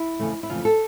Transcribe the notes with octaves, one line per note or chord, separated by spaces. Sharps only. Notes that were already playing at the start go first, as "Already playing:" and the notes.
Already playing: E4
F2 C#3 E3 A3
E4
F2 C#3 E3 A3 F4
A4